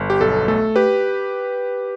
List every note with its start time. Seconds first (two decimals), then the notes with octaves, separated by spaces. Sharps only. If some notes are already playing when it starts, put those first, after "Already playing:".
Already playing: G1
0.10 G4
0.20 B1 A4
0.48 A3 A4
0.76 G4 B4